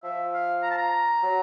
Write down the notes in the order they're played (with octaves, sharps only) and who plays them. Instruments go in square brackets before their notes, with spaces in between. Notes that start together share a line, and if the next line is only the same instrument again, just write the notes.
[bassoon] F3 [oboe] E5
[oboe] F5
A#5
A5
A#5
[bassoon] F#3